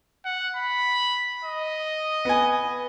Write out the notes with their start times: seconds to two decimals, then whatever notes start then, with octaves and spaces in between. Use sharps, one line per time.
0.25 F#5
0.56 B5
1.44 D#5
2.25 B3 G#5